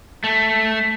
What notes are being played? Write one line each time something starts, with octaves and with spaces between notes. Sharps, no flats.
A3